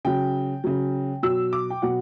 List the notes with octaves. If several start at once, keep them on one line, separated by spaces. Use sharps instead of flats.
C#3 F#3 G5
C#3 F#3
B2 F#3 E6
D6
G5
B2 F#3 F#5